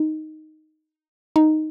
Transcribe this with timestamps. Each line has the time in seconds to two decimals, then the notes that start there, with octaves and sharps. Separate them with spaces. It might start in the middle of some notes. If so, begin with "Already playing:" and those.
Already playing: D#4
1.36 D#4